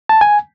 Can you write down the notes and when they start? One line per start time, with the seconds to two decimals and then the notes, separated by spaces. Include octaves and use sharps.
0.09 A5
0.21 G#5